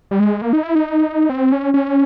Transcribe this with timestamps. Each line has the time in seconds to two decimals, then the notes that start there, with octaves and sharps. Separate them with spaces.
0.11 G3
0.20 G#3
0.42 A#3
0.53 D#4
0.63 E4
0.75 D#4
1.30 C4
1.52 C#4
1.74 C#4